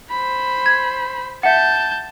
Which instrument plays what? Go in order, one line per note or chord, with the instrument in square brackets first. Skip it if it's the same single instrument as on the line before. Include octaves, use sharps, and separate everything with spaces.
[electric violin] C5 B5
[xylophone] G#6
[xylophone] E5 F#5 [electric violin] A5 G6